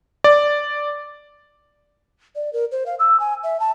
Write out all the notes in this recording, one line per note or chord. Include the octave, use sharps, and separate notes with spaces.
D5
D5
A#4
C5
F5
E6
G#5
E5
A5